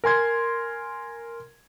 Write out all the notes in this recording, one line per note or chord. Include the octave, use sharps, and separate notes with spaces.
A#4 G#5 C6 G#6